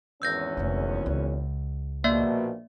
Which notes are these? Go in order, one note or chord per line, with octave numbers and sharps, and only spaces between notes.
G#1 E2 C#4 E6 G6 A#6
F1 D3
C#2
A#1 B2 A#3 D5 E5